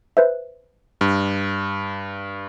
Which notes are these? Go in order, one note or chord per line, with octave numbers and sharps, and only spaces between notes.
B4 C5 E5
G2